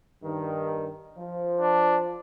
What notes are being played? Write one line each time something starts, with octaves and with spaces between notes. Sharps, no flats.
G2 D#3
F3
D4